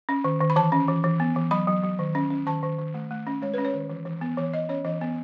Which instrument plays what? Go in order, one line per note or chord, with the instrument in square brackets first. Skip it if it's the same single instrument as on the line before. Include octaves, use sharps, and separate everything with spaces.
[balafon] C#4
D#3
D#3
B5
E3 A5
C#4
E3
E3
B3
E3
F#3 B5
F#3
F#3
D#3
C#4
C#4
D#3 A5
D#3
D#3
A3
A3
C#4
G#3 C#5
C#4 B4
C#5
D#3
E3
E3
B3
E3 C#5
E3 D#5
C#4 C#5
E3 D#5
B3